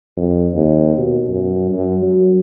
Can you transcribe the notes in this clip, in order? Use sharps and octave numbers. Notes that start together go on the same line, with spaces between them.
F2
D#2
B2
F#2
F#2
F#3